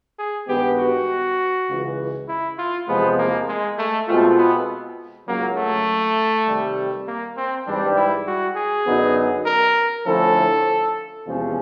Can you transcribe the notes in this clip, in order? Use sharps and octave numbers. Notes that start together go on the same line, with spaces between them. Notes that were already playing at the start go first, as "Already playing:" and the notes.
G#4
G2 D#3 G#3 B3 G4
F#4
C#2 C#3 E3
E4
F4
E2 C3 F3 G#3 B3
A#3
G#3
A3
B2 G#3 A3 C4 F4
B3
C#2 C#3 F#3 A#3
A3
C3 D#3 G3
A#3
C4
G#2 E3 G3 D4
E4
F#4
G#4
F#2 D3 F#3 B3 D#4
A#4
D3 F3 A3 C#4 E4 A4
E2 C3 F3 G#3 C#4